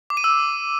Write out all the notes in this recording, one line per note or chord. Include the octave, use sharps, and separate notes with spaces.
D6
D#7
E6